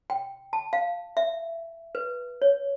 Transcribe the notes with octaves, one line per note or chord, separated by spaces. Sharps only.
G5
A5
F5
E5
B4
C#5